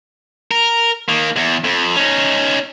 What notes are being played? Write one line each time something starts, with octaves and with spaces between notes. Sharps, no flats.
A#4
D#3 A#3
E2
F2
C#4 D#4